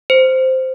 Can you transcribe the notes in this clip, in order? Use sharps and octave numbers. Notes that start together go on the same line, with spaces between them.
C5